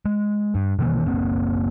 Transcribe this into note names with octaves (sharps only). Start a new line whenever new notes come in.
G#3
G2
B2 D#3 E3 A#3
F#1 A#3 C4